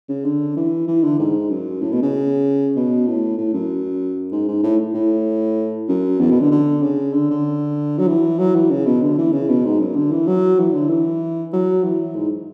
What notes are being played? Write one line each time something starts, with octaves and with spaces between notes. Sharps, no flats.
C#3
D3
E3
E3
D3
G#2
F#2
A2
B2
C#3
B2
A2
A2
F#2
G#2
G#2
A2
A2
F#2
E2
B2
D3
D3
C#3
D3
D3
F#3
E3
F#3
E3
C#3
B2
D3
E3
C#3
B2
G#2
F#2
D3
E3
F#3
E3
D3
E3
F#3
E3
G#2